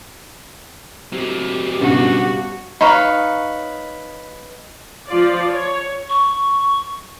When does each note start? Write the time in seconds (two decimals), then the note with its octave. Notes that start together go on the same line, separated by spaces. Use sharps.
1.12 F#3 C4 G4
1.81 B1 G2 C#3 F#4
2.81 D#4 B4 C#5 F5
5.08 F3 F4 D5
5.50 C#5
6.09 C#6